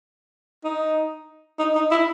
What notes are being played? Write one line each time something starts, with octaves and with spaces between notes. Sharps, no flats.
D#4
D#4
D#4
E4